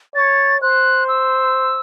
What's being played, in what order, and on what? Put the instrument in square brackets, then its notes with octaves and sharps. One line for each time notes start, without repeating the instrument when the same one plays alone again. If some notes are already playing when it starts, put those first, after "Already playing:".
[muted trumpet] C#5 [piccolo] A6
[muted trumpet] C5 [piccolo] F#6
[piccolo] E6